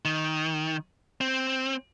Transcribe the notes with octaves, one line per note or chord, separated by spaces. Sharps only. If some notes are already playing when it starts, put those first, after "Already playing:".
D#3
C4